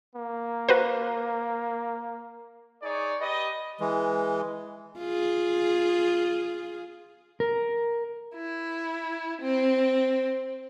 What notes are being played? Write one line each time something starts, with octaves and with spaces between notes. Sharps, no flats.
A#3
F#4 B4 C5
D#4 G#4 C#5 D5
G4 B4 D#5
E3 G#3
F4 G#4
A#4
E4
C4